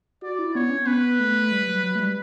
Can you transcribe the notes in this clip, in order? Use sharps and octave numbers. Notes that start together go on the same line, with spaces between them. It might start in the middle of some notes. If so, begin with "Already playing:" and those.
F#4 D5
E4
B3 C#5
C#4
B3 B4
A3
G3
F#3
F#3
A3
G3